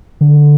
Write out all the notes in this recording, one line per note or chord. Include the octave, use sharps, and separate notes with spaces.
D3